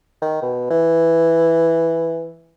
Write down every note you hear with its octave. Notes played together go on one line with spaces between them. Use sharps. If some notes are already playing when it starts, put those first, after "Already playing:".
D#3
B2
E3